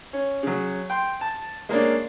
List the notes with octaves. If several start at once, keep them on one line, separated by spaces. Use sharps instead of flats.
C#4
C#3 F#3
G5 C6
A5
G#3 A#3 C#4 D4